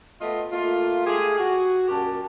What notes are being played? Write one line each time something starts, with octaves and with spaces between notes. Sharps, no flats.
A3 B3 F4 D#5
A3 A#3 F4
G#3 A3 G4 G#4
F#4
F#2 A#2 G4 A#4 A5